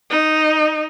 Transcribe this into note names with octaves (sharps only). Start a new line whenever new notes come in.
D#4